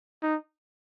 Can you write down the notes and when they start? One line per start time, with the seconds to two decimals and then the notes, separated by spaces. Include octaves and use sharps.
0.22 D#4